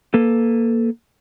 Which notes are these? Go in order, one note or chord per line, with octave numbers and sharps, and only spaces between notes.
A#3 A4 B4